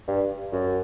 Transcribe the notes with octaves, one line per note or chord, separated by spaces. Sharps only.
G2
F#2